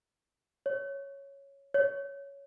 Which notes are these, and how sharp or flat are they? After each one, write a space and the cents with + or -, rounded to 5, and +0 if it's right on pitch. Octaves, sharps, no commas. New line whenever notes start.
C#5 +0
C#5 +10